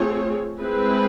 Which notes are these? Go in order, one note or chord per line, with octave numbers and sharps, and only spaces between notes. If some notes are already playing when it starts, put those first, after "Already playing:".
Already playing: A3 C4 F4 G#4 C#5
G#3 C4 E4 G#4 B4